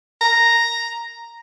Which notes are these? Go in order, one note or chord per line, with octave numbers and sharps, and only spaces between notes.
A#5